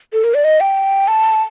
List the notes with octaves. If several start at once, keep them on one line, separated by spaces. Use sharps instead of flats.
A4
A#4
D5
D#5
G5
A5